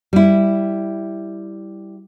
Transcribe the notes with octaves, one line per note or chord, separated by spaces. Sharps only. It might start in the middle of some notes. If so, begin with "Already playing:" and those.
G3 E4